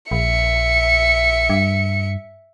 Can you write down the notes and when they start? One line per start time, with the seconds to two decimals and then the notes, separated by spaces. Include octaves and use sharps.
0.11 A#1 E5 C#7
1.50 G2